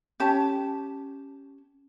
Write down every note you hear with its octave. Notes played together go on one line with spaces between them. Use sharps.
C#4 G4 A5